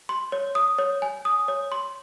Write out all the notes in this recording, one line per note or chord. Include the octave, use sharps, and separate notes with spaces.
C6
C#5
D#6
C#5
G#5
D#6
C#5
C6